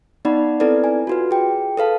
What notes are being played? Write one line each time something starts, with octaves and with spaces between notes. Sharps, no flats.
B3 D#4 D5 F#5 B5
C4 E4 A4 B4 D5
G#5
F4 F#4 B4
G#4 G5
A4 B4 F5 A5